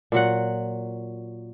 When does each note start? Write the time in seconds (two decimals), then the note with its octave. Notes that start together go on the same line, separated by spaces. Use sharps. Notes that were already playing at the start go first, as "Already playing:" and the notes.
0.12 A#2 F#3 F#5